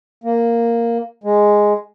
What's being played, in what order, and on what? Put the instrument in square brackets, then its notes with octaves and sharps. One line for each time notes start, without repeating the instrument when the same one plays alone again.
[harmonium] A#3
G#3